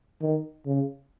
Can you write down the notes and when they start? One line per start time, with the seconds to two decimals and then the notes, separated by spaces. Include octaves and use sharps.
0.21 D#3
0.66 C#3